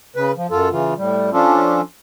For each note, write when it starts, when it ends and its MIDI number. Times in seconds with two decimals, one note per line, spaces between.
0.16 0.32 49
0.16 0.32 71
0.37 0.47 53
0.51 0.69 42
0.51 0.69 65
0.51 0.69 69
0.71 0.94 49
0.71 0.94 52
0.71 0.94 65
0.98 1.30 45
0.98 1.30 55
1.33 1.81 53
1.33 1.81 61
1.33 1.81 62
1.33 1.81 65
1.33 1.81 69